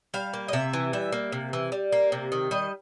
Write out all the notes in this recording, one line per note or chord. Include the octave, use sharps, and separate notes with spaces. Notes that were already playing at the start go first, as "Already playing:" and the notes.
G3 F5
A#3
D#5
C3 E5
E3
G3 E5
A#3
C3
E3
G3
A#3
C3
D#3
G3 D#5